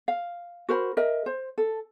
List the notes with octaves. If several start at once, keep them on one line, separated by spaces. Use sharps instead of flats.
F5
F#4 A#4 C5 B5
A#4 D#5 E5
C5
A4